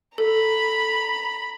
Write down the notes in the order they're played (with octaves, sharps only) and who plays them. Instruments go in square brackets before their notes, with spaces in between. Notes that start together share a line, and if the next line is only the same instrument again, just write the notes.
[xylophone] A4 [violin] A#5 B5